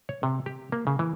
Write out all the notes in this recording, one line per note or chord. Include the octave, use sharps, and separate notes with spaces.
C#5
C3
G4
A#3
C#3
E3